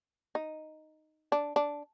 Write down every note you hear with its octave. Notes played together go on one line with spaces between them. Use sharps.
D#4
D4
D4